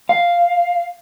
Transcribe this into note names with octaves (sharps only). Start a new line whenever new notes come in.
F5